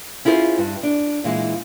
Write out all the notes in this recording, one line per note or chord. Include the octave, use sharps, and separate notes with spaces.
C#4 E4 F4 G#4 A#4 C5
G2
D4
A#2 E3 G#3